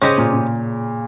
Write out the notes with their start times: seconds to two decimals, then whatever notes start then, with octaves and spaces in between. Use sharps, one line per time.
0.02 C#3 C#4 G4 C5 D#5
0.18 A#2
0.33 A#2